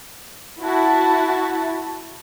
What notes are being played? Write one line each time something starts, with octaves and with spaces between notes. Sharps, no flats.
E4 F#4 A5